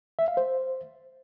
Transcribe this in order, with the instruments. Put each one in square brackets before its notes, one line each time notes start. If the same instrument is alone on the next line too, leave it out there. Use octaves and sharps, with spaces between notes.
[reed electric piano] E5
F5
C5